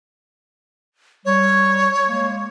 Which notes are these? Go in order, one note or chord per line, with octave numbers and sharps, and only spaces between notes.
G3 C#5
G#3 A#3